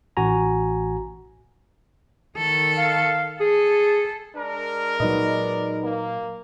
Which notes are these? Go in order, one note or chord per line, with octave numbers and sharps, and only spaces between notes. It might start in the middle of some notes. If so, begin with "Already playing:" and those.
A1 F#4 G#5 A#5
D#3 A4
F5
G#4 A4
G#3 D4 A#4
A#2 F#3 D#4 B4 D5 D#5
A#3